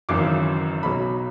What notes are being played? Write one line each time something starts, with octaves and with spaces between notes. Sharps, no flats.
G#1 F#2 C#3 E3 D6
B1 B2 F#3 B5